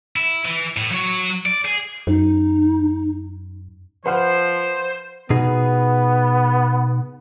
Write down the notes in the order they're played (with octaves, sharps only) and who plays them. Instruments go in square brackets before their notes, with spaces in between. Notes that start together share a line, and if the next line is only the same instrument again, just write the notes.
[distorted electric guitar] E4
E3
A2
F#3 C#5
D5
G#4
[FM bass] F#2 [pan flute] D#4
[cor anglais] F3 [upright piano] B4 F#5 F6 [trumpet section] C5
[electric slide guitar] B2 D#4 G#4 [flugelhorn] B3